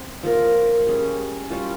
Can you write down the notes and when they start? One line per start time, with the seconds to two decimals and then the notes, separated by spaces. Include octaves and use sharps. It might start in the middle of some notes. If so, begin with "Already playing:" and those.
Already playing: C4
0.23 F3 A#3 F4 A#4
0.87 G3 C#4 G#4
1.50 G3 C#4 F4